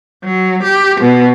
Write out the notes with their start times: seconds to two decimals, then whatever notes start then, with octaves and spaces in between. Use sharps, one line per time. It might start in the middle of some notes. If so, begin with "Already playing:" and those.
0.24 F#3
0.63 G4
1.00 B2